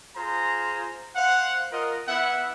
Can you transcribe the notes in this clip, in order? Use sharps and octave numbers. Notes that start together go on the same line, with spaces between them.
F4 G#4 C5 A#5
C5 F5 F#5
F4 A#4 D#5 F#5
B3 E4 E5 F#5